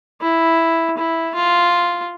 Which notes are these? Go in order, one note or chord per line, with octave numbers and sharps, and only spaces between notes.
E4
E4
F4